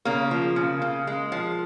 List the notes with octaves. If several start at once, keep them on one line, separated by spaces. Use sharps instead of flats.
C#3 A#3
F3
C#3
C#3
G#3
F3